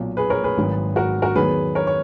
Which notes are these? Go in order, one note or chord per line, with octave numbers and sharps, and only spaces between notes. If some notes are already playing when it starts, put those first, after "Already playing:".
Already playing: B1 A#2 F#3
G#4 B4
A#4 C#5
G#4 B4
G#1 G#2 D#3 F#3
F#4 A#4
F#4 A#4
E2 D#3 F#3 G#4 B4
A#4 C#5
C#5